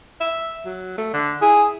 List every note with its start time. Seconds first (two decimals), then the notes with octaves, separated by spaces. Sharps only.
0.20 E5
0.65 F#3
0.98 A3
1.13 D3
1.41 E4 G#4